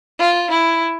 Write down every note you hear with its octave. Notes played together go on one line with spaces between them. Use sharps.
F4
E4